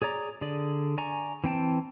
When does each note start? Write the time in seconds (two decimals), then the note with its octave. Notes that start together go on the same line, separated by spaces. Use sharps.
0.02 G#4 C#5 D5 A#5
0.41 D3 G#4 D5
0.98 D5 G#5 A#5 C#6
1.44 E3 C4 G5 A5